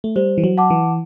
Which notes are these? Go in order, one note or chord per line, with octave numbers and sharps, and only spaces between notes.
A3
G3 C5
E3
F#3
F#5 A5 D6
E3